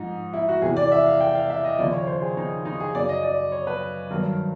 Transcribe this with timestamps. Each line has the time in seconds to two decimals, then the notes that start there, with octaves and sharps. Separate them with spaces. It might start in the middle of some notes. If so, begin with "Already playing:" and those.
Already playing: G#2 F3 D#4
0.33 E4
0.49 F#4
0.62 E2 C3 E3 G#4
0.77 D5
0.92 E5
1.06 F5
1.21 G5
1.35 F5
1.50 E5
1.64 D#5
1.78 D#2 C#3 F3 D5
1.92 C#5
2.07 C5
2.22 G#4
2.37 D#4
2.65 D#4
2.80 G#4
2.95 F#2 C#3 F#3 D5
3.09 D#5
3.23 D5
3.52 C#5
3.67 B4
4.11 G2 D#3 F#3 A#4